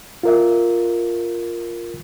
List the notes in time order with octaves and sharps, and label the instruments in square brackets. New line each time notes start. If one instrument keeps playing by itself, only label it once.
[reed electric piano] F4 A#4 E5